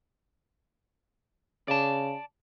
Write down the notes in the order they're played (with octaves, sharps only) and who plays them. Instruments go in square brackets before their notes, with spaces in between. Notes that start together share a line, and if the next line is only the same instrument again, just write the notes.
[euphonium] C#3 [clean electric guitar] D5 A5